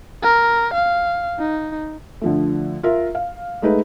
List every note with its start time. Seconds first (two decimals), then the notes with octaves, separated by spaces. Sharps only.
0.23 A#4
0.74 F5
1.39 D#4
2.21 D3 F3 A3
2.83 F4 A#4 E5
3.15 F5
3.62 G#3 A3 D#4 G#4 B4